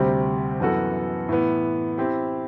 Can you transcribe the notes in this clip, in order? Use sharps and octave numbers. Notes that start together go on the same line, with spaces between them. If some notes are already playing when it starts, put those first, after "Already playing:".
Already playing: D2 C3 G3 C4 G4
F#2 E3 B3 F#4 A4
A2 E3 B3
C4 E4 G4